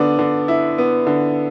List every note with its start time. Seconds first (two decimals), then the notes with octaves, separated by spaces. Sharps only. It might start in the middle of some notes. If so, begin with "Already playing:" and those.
Already playing: D3 B3 D5
0.19 D3
0.48 E4
0.78 B3
1.07 D3